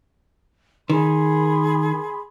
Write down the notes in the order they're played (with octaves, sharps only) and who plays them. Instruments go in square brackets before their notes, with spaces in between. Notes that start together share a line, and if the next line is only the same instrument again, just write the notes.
[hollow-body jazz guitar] D#3 [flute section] G#4 B5 C6